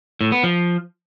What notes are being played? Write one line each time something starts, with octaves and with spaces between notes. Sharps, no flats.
A2
B3
F3